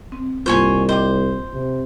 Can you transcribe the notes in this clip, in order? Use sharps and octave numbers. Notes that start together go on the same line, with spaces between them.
C4
C2 G#2 A#3 F4 C5 C#5 G#5
C5 D#5 G5 D6
C3